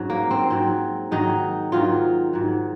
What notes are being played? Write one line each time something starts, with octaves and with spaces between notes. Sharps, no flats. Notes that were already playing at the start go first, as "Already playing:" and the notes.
Already playing: G#2 F#3 C#4
A#3
C4
G#2 F#3 C4
G#2 D#3 F#3 D#4
G#2 D#3 F#3 F4
G#2 F#3